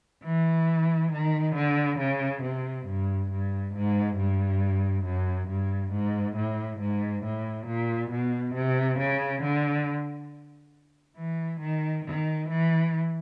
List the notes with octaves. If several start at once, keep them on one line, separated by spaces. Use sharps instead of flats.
E3
D#3
D3
C#3
C3
G2
G2
G#2
G2
F#2
G2
G#2
A2
G#2
A2
A#2
B2
C3
C#3
D3
E3
D#3
D#3
E3